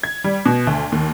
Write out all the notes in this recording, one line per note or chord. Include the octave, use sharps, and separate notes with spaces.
G#6
G3
B2
D2
D#2